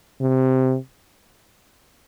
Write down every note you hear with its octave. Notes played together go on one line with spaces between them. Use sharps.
C3